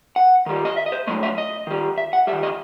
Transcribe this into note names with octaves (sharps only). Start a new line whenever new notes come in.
F#5
D#3 G3
D#5
E5
D#5
C5
A2 F#3 A3 D#5
E5
D#5
D#3 G3
E5
F#5
G3 E5
D#3
D#5